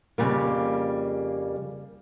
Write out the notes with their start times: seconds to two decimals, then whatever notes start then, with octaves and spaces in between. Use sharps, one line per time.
0.18 F2 C#3 G3 A#3